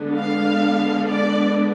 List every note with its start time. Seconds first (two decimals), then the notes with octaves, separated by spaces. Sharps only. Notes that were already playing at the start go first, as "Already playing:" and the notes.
Already playing: D3 G#3 B3 D4
0.17 F5
1.09 D5